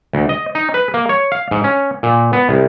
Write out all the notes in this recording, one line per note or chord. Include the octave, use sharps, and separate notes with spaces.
D2
D#5
D#4
B4
A#3
C#5
F5
G#2
C#4
A#2
B3
C2